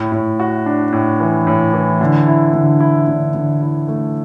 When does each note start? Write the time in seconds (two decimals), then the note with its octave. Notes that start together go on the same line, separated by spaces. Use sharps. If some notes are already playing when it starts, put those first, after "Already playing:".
Already playing: A2
0.12 A2
0.40 F#4
0.66 D4
0.93 A2
1.20 E3
1.47 A2
1.73 E3
2.01 D3
2.27 E4
2.54 D3
2.80 E4
3.08 D3
3.35 D3
3.62 E4
3.88 A3